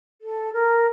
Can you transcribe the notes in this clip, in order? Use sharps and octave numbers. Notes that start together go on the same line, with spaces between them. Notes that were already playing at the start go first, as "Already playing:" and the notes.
A4
A#4